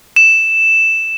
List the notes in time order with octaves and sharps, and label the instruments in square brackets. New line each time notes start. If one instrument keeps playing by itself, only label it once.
[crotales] E7